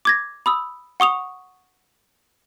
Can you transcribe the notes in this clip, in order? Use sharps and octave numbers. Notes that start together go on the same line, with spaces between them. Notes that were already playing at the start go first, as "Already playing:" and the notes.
D6 G#6 A#6
B5 D#6 E6
F#5 C#6 D#6 F7